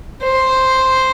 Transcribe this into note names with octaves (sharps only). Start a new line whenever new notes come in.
C5